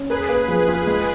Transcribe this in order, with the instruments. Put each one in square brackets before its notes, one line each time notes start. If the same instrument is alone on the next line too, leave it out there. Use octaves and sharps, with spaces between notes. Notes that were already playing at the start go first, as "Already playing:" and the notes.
Already playing: [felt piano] C#4
[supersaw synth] G#4 B4 [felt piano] A#4
[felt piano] A#3
F3
F4
G#3